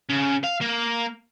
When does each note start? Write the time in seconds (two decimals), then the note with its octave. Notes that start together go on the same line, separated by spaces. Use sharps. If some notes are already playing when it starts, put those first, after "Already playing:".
0.09 C#3
0.44 F5
0.61 A#3